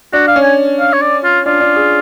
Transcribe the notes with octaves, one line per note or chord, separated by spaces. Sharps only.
D4 F#4
F5
C#4
G#5
F5
C#5
D5
F4
D4 F4
D4
G#4